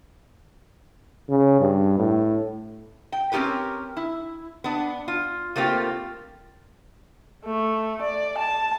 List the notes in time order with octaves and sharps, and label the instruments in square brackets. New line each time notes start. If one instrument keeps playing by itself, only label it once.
[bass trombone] C#3
G2
A2
[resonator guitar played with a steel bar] G5
C4 C#4 F#4 G4 A#4 B4
E4
B3 D4
F4
A3 A#3 C4 F4 G4
[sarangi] A3
D5
A5